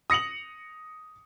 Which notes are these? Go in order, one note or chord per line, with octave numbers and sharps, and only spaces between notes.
D#6 A#6 C#7 F7 F#7